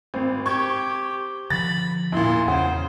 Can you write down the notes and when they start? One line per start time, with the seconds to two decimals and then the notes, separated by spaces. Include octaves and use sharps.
0.14 G#1 C4
0.46 G4 C#6 G#6
1.50 D3 F3 B5 A6
2.12 E2 A#2 E4 C6
2.48 E2 C#3 C5 F#5